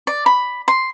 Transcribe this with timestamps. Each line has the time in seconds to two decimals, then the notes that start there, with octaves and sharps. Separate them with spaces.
0.07 D5
0.26 B5
0.68 C6